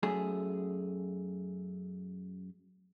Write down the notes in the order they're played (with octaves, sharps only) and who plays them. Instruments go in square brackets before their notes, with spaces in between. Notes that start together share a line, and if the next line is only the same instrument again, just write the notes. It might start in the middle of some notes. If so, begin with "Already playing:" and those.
[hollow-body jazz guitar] F#2 A3 G#4